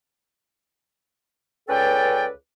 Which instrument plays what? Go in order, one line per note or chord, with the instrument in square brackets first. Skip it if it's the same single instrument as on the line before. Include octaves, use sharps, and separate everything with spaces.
[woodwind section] C#2 C#4 A4 B4 D5 G5